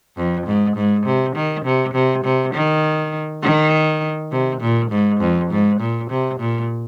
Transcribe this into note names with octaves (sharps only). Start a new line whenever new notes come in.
F2
G#2
G#2
C3
D#3
C3
C3
C3
D#3
D#3
C3
A#2
G#2
F2
G#2
A#2
C3
A#2